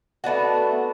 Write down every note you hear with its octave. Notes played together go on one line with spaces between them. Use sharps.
A3 B3 D4 F#4